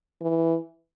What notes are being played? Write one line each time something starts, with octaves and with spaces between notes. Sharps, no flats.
E3